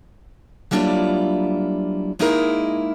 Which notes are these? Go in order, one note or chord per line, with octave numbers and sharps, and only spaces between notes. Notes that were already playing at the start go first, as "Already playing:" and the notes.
F#3 G3 A#3 D4 E4 F4
G#3 A#3 D#4 E4 G#4 A#4